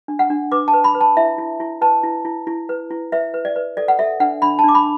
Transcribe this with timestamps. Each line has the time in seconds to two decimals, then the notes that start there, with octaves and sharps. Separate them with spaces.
0.08 D4
0.19 F#5
0.30 D4
0.52 B4 D6
0.68 A5
0.73 B4
0.84 B5
0.95 B4
1.01 A5
1.17 E4 E5
1.38 E4
1.60 E4
1.81 B4 A5
2.04 E4
2.25 E4
2.47 E4
2.69 B4
2.90 E4
3.12 B4 E5
3.34 B4
3.45 D5
3.56 B4
3.77 A4 D5
3.88 F#5
3.99 A4 E5
4.20 D4 F#5
4.42 D4 B5
4.59 A5
4.64 D4 D6
4.75 B5